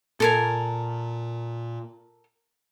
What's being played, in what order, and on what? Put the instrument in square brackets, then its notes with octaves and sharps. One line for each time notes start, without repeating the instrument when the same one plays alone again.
[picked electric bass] A#2 [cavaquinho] A4 A#4 G#5